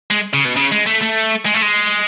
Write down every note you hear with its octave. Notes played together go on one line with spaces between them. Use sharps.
G#3
C#3
B2
C#3
G#3
A3
A3
G#3
A3
G#3